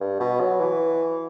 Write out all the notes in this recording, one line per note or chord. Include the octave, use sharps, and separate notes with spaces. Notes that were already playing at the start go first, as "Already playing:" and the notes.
G2
B2
F#3
E3